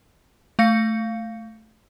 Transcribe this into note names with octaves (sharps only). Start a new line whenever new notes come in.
A3 F5 A#6 C#7